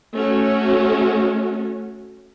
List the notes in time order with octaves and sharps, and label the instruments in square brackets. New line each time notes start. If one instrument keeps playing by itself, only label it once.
[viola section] A3 C#4 F#4